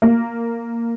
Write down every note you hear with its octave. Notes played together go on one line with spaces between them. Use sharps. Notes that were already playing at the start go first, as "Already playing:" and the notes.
A#3